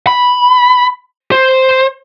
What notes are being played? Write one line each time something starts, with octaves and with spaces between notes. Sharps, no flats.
B5
C5